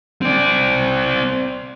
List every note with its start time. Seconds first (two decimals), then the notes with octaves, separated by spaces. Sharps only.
0.22 C4 D5